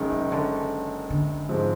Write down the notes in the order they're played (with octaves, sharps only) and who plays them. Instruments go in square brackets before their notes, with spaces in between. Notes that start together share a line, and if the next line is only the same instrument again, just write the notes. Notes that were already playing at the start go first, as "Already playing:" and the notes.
Already playing: [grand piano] F#1 F#2 D#3 G#3
[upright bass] C3
D3
D3
[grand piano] G#2 F3 G#3 C4